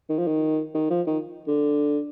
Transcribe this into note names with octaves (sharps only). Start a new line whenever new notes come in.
D#3
F3
D#3
D#3
F3
D#3
D3